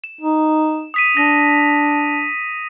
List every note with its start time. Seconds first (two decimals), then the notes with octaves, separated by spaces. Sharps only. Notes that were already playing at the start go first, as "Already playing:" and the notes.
0.04 E7
0.21 D#4
0.94 D#6 B6 D#7
1.17 D4 A#6